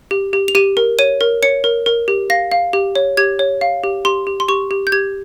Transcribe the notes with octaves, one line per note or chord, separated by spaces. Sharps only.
G4
G4
F7
G4 D#7
A#4
C#5 D#7
A#4
C#5 C#7
A#4
A#4
G4
F5 A#6
F5
G4
C#5
G4 G#6
C#5
F5
G4
G4 C6
G4
C6
G4 C#6
G4
G6
G4 G#6